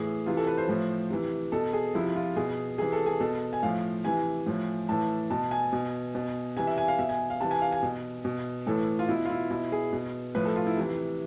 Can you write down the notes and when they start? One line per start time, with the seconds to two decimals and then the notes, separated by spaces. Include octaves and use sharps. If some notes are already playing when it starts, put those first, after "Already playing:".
Already playing: A2 E3 G#4
0.26 C3 E3 F4
0.37 A4
0.47 B4
0.58 C5
0.68 A2 F3
1.10 C3 E3
1.52 B2 A4
1.73 G#4
1.94 C3 F3 E4
2.16 F4
2.36 B2 G#4
2.78 C3 E3 G#4
2.92 A4
3.06 G#4
3.20 B2 A4
3.53 G#5
3.63 A2 F3 F5
4.05 C3 E3 G#5
4.46 A2 F3
4.89 A2 E3 A5
5.30 B2 A5
5.51 G#5
5.73 B2
6.15 B2
6.56 C3 E3 G#5
6.67 E5
6.78 G#5
6.88 F5
6.99 B2 E5
7.09 G#5
7.30 F5
7.41 C3 E3 A5
7.51 G#5
7.62 F5
7.72 G#5
7.83 B2
8.25 B2
8.67 A2 E3 A4
8.99 F4
9.09 B2 E4
9.25 F4
9.30 E4
9.51 B2 E4
9.72 G#4
9.93 B2
10.35 A2 F3 B4
10.45 A4
10.56 F4
10.66 E4
10.77 C3 E3